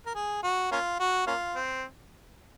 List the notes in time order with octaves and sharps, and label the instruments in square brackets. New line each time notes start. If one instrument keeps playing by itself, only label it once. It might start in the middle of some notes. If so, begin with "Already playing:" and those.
[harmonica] A#4
G#4
F#4
A#3 C#4 F4
F#4
A#3 C#4 F4
C4